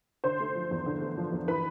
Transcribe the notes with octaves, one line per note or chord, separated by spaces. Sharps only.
D3 C5 C6
A3
F3
E2
D3
A3
F3
E2
E3 B4 B5